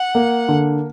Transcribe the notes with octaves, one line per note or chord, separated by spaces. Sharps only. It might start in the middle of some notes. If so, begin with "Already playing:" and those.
Already playing: F#5
A#3
D3